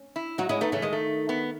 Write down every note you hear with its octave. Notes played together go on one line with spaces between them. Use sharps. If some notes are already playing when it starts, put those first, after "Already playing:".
Already playing: C#4
E4
F#3 D#4 F#4
G#3 C#4 E4
A3 B3 D#4
C#3 E3 A3
D#3 G#3
A3
B3